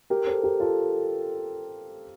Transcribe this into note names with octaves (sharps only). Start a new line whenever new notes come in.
G4 A#4
A4 C5
G4 A#4
F4 A4